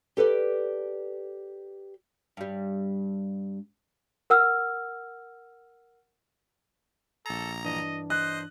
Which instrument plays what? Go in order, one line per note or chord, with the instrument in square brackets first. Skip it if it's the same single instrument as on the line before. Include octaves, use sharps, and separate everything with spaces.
[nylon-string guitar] G4 A4 B4 D5
[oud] G2 G3
[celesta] A#4 F#5 E6 F6
[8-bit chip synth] A#1 A#5 [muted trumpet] A4
[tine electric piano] G2 E3 D4 [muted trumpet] D#5
[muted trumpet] C5 [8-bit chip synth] D#5 [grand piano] F#6